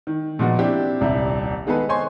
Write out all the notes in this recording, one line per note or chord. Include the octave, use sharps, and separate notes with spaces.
D#3
A#2 F3 G#3 B3 D#4 F#4
C4 D4 E4 G4
D#1 C2 G3 E5
D#3 G#3 B3 G#4 A4 B4
C5 C#5 D#5 G#5 C6